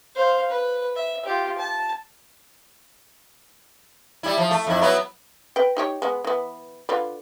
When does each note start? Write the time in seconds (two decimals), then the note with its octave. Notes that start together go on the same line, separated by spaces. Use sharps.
0.15 C5 F5
0.50 B4
0.96 E5
1.25 F4 G4
1.58 A5
4.23 G3 E4
4.38 F3
4.51 A3
4.67 F2 E4
4.82 F#3 B3 E4
5.56 B4 G5
5.77 D#4 G4 C#5
6.02 G#3 B3
6.24 E3 B3
6.89 D3 F4 B4